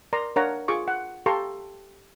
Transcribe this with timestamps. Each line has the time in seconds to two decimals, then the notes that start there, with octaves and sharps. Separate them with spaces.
0.13 A#4 D5 A#5 C6
0.36 D4 A#4 C#5 F5 F#5 A#5
0.68 F4 G#4 C#6 D6
0.88 F#5
1.26 G4 A4 F5 A#5 C6 C#6